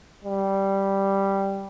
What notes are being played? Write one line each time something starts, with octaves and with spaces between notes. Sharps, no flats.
G3